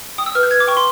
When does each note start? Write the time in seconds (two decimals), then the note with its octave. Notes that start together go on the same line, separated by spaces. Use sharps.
0.18 G5 D#6
0.26 E6
0.35 B4 F6
0.43 G6
0.51 B4 G#6
0.60 D6
0.68 G5 C#6
0.77 C6